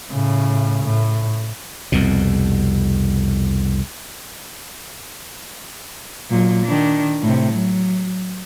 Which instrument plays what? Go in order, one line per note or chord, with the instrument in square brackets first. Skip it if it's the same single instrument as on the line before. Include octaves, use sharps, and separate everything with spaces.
[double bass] A2 C#3
A2
[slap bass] C2 F2 B2
[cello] A#2 F#3
D#3 D4
A2 C3
F#3